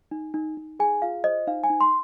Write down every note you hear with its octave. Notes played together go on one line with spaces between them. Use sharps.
D#4
D#4
D#4
G#4 G#5
F4 F5
C5 D#5
D#4 F5
G#5
D#4
C6